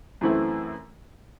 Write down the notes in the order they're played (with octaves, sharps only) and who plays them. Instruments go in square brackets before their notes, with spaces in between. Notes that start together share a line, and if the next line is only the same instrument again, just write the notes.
[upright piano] F#2 E3 A3 C4 E4